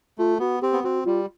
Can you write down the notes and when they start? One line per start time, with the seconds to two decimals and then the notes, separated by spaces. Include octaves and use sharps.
0.18 A3 F4
0.39 B3 F#4
0.62 C4 G4
0.73 B3
0.84 C4 F#4
1.05 G3 F4